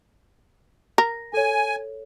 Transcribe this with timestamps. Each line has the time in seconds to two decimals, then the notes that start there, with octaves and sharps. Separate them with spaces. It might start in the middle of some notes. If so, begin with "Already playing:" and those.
0.98 A#4 A#6
1.34 A4 C#5 G#5